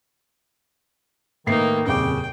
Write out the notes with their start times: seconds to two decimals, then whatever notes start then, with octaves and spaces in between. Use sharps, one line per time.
1.47 A2 D#3 A#3 D#4 B4 C7
1.86 D#1 F2 C#3 G5 D6